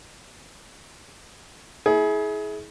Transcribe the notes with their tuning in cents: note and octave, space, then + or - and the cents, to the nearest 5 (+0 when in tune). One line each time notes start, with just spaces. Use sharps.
E4 -30 G#4 +25